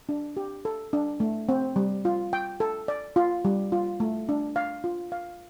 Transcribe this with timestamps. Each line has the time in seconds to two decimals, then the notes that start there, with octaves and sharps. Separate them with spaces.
0.09 D4
0.37 G4
0.65 A4
0.93 D4
1.20 A3
1.49 C4
1.76 G3
2.05 F4
2.33 G5
2.60 A4
2.88 D5
3.16 F4
3.45 G3
3.72 F4
4.00 A3
4.29 D4
4.56 F5
4.84 F4
5.12 F5